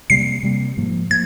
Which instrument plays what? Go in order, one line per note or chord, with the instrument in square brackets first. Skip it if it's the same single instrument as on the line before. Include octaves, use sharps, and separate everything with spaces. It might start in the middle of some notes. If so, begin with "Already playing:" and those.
[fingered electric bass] C3 G3 A#3 [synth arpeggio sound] C7
[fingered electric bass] C3 G3 A#3
G#2 F3 A#3
[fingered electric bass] F3 A#3 [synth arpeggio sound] G#6